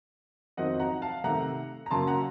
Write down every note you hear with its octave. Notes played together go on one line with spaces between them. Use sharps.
F2 D#3 F#3 C4 D#4 D#5 F#5
F#5 A#5
F5 A5
C3 D#3 A3 F#5 A#5
A#5
F#2 C#3 F#3 A#3 A5 C6
F#5 A#5